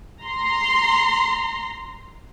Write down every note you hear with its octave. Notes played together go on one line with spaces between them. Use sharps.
A#5 C6